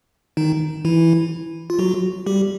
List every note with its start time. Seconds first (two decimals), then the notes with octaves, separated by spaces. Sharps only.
0.37 D#3 D#4
0.85 E3 E4
1.70 F4
1.79 F#3 F#4
2.26 G3 G4